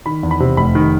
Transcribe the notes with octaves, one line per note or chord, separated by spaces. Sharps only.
D#3 B5
E2
B5
C3
F1 B5
D#3